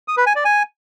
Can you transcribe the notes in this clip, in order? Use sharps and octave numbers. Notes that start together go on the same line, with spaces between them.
D#6
B4
G#5
D5
G#5